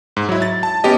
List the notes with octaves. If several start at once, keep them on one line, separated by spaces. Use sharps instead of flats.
G#2
F#3 E4
A6
A5
B3 C#4 G4 D#5